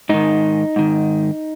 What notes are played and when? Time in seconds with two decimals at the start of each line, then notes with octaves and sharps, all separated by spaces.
0.09 G#2 D#3 D#4
0.76 G#2 D#3